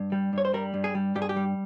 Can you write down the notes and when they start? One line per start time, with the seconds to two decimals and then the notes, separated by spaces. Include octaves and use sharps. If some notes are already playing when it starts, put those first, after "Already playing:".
Already playing: G2
0.12 G3
0.33 G2 C#5
0.45 C5
0.54 G3 A#4
0.74 G2
0.84 G#4
0.95 G3
1.15 G2 G4
1.22 G#4
1.29 G4
1.36 G3